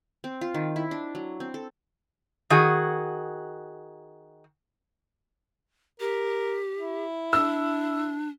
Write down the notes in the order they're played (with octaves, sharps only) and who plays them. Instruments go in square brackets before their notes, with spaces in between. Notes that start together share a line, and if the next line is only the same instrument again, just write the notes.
[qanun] C4
F4
D#3
E4
D4
F#3
C4
A4
[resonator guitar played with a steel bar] D#3 F#4 G#4
[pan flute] G4 [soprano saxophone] A#4
[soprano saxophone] E4
[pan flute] D4 [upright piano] E6